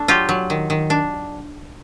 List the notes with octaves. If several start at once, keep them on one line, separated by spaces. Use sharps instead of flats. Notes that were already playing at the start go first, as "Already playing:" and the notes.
Already playing: A3 D4
F#3 F4 G4
F#3
D#3
D#3
D4